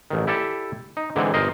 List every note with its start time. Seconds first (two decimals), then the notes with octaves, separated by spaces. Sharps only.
0.10 A1 D#3
0.27 E4 G4 A4 D5 E5
0.97 D#4
1.16 G#2 D3 E3 G#3 C4
1.34 G1 A#4 C5 D#5